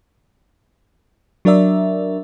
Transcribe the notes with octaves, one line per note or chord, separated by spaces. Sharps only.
F#3 D4 A#4 D5 E5